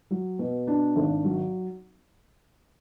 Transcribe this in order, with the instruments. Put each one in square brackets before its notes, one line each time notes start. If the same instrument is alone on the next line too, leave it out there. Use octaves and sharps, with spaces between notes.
[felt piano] F#3
B2
D4
G#1
F#3